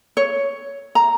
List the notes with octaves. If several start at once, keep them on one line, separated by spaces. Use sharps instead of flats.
C#5
A#5